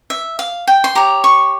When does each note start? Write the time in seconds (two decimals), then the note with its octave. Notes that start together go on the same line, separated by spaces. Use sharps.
0.10 E5
0.39 F5
0.67 G5
0.84 C6
0.95 G4 C#5 A#5
1.24 C#6